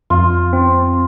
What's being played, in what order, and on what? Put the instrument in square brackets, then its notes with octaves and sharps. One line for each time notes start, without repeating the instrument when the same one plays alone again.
[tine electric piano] F2 [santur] F4
[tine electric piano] C4